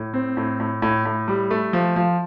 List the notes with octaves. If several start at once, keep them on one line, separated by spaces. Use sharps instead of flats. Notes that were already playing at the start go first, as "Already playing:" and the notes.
Already playing: A2
C4
A2
A2
A2
A2
G3
A3
F3
F3